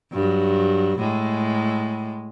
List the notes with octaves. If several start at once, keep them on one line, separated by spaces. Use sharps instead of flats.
G2 F#3
A2 G#3